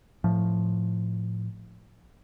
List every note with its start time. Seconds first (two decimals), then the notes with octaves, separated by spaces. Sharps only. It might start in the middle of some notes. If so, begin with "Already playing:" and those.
0.24 A2 F3